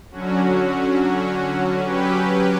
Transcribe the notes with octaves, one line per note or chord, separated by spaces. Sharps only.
D3 F#3 C#4 F#4
F#3 C#4 G4 B4